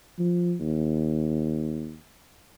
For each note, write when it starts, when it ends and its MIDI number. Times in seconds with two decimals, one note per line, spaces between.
0.19 0.55 53
0.60 1.97 39